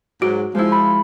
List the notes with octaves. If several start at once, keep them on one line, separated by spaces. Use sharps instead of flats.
G#2 F#3 F#4
F3 G#3 E4
B5